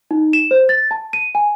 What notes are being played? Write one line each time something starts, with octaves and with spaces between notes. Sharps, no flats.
D#4
E7
C5
A6
A5
D#7
G#5